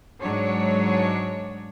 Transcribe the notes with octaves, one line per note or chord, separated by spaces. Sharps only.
G#2 F#3 G#3 D4 C#5